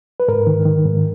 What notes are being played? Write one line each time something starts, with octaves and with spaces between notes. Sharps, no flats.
B4
G#2 A#4
D#3
D#3
G#2